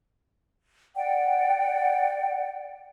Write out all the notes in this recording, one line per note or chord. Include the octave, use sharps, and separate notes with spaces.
D5 F#5 G5